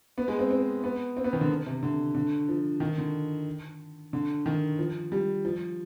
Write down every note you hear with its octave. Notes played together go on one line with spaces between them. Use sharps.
B3
G#3
C4
C4
B3
C4
B3
D#3
D3
C3
D3
D3
F3
D#3
D3
D3
D#3
F3
G3
F3